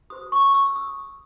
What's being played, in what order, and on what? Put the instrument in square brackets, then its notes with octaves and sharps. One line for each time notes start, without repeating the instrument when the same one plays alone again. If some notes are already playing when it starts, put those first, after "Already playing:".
[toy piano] F#4 C5 D#6
C#6
E6
D#6